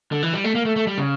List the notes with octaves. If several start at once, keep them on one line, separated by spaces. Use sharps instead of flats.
D3
E3
G3
A3
A#3
A3
A3
G3
C#3